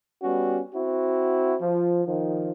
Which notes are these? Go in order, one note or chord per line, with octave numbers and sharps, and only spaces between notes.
G3 B3 C#4 F#4
C4 E4 F#4
F3
D#3 F3